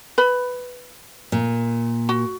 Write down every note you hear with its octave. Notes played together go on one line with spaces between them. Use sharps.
B4 B5
A#2
F#4